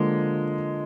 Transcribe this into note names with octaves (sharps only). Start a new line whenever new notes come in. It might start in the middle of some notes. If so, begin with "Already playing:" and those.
Already playing: D3 F3 G#3 A#3